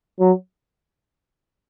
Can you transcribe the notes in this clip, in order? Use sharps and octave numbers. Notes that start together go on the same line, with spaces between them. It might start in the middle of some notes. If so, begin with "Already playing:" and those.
F#3